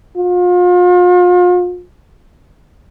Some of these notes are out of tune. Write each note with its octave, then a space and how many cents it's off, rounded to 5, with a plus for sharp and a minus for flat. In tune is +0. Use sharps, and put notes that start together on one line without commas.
F4 +40